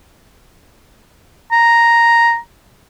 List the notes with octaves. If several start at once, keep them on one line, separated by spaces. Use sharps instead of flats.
A#5